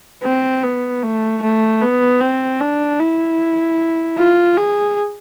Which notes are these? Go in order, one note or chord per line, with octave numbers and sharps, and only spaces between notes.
C4
B3
A3
A3
B3
C4
D4
E4
F4
G#4